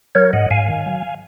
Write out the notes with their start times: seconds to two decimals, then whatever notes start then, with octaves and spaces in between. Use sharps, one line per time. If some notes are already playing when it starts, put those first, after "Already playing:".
0.15 F#3 A#4 C#5
0.33 G#2 D#5 F#5
0.50 G#2 F5 G#5
0.68 D#3
0.86 F#3